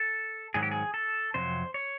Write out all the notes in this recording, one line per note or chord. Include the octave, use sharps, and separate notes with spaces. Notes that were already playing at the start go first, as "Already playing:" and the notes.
Already playing: A4
G#2 D#3 F#3 G#4
G4
G#4
A4
F2 C3 F#3 C5
C#5